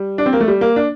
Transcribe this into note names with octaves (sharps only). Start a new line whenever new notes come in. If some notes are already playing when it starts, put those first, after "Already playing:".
Already playing: G3
D4
C4
A#3
A3
G3
A#3
D4